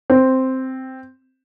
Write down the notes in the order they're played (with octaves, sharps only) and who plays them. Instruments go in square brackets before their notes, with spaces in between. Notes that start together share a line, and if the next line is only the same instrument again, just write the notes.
[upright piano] C4